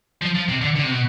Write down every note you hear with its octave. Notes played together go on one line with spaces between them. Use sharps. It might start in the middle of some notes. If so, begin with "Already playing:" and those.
F3
F3
C3
D3
D3
C3
B2